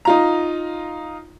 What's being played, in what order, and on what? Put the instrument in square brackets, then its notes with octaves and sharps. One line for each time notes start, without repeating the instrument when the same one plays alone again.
[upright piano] D#4 F4 A#5